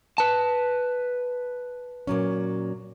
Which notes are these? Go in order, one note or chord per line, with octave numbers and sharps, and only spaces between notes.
B4 A5
A#2 F#3 C#4